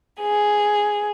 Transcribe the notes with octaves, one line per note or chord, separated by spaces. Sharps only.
G#4